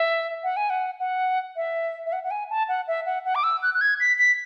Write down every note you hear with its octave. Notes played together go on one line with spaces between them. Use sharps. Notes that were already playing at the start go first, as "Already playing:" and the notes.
Already playing: E5
F#5
G#5
F#5
F#5
E5
E5
F#5
F#5
G#5
A5
F#5
E5
F#5
F#5
D6
E6
F#6
F#6
G#6
B6
B6